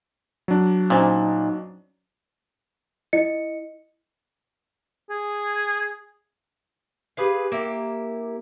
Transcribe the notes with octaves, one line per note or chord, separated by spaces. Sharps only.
F#3 D4
A#2 C#4 D#4 C5 G#5
E4 D#5 C#7
G#4
G4 G#4 B4 F5
A#3 E4 G4